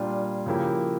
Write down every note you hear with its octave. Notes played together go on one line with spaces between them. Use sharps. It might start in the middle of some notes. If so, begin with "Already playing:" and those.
Already playing: A#2 G3 D4 F4
C#3 F3 A#3 E4 G4